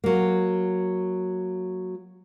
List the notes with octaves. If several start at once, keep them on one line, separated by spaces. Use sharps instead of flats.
F#3 A#3